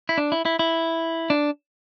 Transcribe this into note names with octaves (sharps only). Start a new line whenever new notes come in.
E4
D4
E4
E4
E4
D4